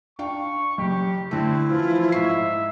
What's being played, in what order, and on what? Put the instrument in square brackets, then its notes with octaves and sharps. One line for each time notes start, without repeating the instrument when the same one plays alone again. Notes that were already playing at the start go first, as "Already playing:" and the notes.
[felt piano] D4 F5 G5 [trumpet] C#6
[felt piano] F#1 [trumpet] G4
[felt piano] D3 A3 [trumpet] C4 [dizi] E4
[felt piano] E3 [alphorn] F3 [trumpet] F4
[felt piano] G#2 C#6 C7 [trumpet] E5